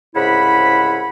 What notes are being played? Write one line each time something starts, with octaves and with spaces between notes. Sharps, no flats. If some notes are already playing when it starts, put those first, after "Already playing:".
C2 G#2 C#3 E4 F#5 B5